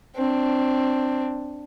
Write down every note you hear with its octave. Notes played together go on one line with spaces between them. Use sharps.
C4 D4